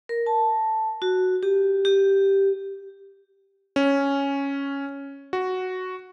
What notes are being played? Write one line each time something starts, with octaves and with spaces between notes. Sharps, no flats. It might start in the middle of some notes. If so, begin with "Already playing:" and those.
A#4
A5
F#4
G4
G4
C#4
F#4